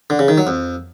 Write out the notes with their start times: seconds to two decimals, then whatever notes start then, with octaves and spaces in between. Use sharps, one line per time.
0.10 D3
0.19 C#3
0.28 D#3
0.38 F#3
0.47 F2